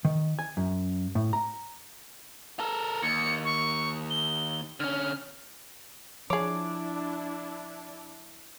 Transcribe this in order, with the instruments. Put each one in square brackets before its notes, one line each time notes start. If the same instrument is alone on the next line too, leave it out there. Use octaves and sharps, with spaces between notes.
[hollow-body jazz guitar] D#3
G#5
F#2
A2
A#5
[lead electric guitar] A4 A#4
[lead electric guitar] D#2 [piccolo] C#7
[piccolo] C#6
G7
[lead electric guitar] D3 C#4 [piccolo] F6
[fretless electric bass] F3 [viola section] D4 E4 [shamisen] G#4 C#5 [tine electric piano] D6